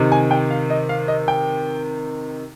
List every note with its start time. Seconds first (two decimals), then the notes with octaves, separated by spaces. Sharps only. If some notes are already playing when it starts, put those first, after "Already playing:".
Already playing: C3 D#3
0.12 G#5
0.31 G5
0.50 F5
0.70 D#5
0.89 F5
1.08 D#5
1.28 G5